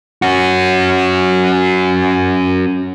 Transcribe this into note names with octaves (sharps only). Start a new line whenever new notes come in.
C#4 F#4